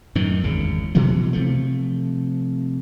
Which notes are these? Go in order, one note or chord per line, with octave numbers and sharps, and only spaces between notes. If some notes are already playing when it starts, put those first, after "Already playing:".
F#2 A2 D#3
G#1 E2 C#3
B2 E3 F#3 A3
C3 F3 A3